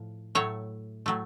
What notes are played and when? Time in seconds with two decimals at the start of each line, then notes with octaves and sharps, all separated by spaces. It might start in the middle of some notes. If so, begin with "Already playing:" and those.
Already playing: A2 F3
0.35 A2 F#3 A3 C#5
1.06 A2 F#3 A3